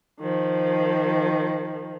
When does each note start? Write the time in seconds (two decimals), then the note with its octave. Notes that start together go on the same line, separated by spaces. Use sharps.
0.21 D#3 F3